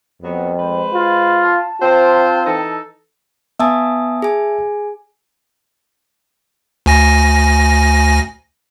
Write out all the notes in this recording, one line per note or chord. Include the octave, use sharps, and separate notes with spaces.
F2 F#3 B3
G#3 B4 C5
F4
A5
C4 F4 C5
E3 D#4 A4
B3 E5 G#5 A5 D#6
G#4 G#5
D2 G#5 A#6